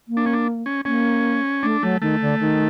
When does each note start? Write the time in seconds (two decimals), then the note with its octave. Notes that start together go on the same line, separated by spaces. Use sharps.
0.08 A#3
0.17 D4
0.26 C#4
0.33 D4
0.66 C#4
0.85 A#3 C#4
1.63 A3 D4
1.82 F#3 A3
2.02 D#3 A3
2.21 D3
2.40 D#3